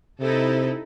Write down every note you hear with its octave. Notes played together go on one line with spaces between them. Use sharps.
C3 D#4 E4 A4